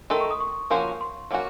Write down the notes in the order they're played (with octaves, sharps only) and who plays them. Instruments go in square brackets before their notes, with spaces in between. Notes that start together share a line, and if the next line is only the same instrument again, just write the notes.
[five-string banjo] D#3 A3 D#4 A4 [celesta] C6
[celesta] C#6
D#6
C#6
[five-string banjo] F3 A#3 C#4 F#4 C5
[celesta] C6
[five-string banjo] F#3 A#3 C#4 F#4